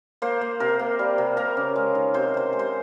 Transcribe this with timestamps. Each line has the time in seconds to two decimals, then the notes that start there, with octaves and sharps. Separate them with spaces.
0.22 A#3 C5
0.41 A#3
0.60 C3 A#4
0.79 A#3
0.99 G3
1.18 C3
1.37 A#3 A#4
1.57 C#3
1.76 G#3
1.95 D#3
2.14 C3 C5
2.34 C3 C5
2.53 G#3
2.59 C5